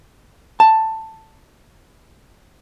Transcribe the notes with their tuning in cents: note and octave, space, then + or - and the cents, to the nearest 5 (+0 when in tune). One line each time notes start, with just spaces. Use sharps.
A5 +10